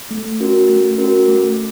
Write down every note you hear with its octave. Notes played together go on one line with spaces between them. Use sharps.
A3
C#4 F#4 A#4
A3
C#4 F#4 A#4
A3